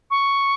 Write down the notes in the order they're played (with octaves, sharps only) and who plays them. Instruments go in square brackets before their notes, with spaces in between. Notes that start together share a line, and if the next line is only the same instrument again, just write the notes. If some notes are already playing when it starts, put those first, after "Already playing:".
[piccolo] C#6